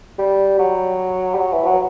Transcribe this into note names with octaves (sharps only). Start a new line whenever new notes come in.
G3
F#3
G3
F#3
E3
F#3